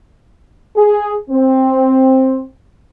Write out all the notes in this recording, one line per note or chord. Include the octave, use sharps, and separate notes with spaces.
G#4
C4